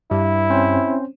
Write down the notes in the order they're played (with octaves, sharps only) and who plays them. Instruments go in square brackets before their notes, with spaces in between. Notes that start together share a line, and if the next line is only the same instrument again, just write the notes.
[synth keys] G2 [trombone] E4
[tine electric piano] C4 C#4 C5